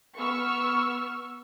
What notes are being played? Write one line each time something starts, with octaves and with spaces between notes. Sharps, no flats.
B3 C#6 E6 F6